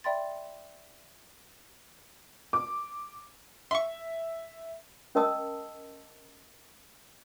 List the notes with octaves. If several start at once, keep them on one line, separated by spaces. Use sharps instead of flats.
D5 E5 G5 B5 C6 A6
D6
E5 C6 C#6
C#4 A#4 D#5 A5 D#6 E6